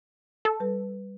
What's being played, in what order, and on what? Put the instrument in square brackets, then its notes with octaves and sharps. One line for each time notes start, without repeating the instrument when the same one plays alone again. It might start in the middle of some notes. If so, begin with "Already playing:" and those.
[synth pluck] A4
[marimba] G3 B4